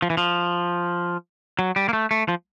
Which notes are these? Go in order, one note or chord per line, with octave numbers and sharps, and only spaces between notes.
F3
E3
F3
F#3
G3
A#3
A3
A3
F3